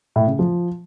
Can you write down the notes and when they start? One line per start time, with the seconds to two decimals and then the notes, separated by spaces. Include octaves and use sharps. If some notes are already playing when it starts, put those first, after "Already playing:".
0.16 A2
0.27 C#3
0.39 F3